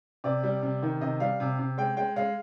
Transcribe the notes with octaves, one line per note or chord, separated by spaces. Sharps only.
C3 D5
G3
C3
D#3
C3 D#5
G3 F5
C3
C3
G#3 G5
G#3 G5
G#3 F5